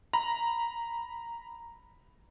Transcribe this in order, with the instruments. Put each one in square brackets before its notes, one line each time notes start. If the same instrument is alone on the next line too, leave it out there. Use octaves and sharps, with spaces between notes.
[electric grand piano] A#5 B5